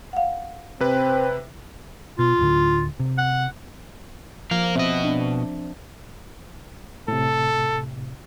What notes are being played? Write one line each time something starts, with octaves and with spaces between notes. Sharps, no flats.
F5 F#5
C3 C4 B4
B2 F4
D1 A2 D3
C3
F#5
F3 A#4 F5
B2 C4 D#5 E5
D4
A2 C3 A4